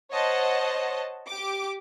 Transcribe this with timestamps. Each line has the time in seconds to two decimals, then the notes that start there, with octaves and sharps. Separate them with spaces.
0.12 C5 C#5 D#5 F#5 A5
1.27 G4 D6